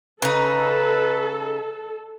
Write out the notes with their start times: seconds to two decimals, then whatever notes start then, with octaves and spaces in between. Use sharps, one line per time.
0.22 C#3 D#4 A4 B4